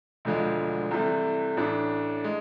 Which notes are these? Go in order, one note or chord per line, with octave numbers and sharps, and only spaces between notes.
E1 D2 D3 F3 G#3
C2 C3 E3 A3
A1 A2 E3 A3 D4
G#3